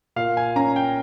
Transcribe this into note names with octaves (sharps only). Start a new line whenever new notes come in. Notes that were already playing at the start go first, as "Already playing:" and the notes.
A#2 F5
G#5
C#4 A#5
G5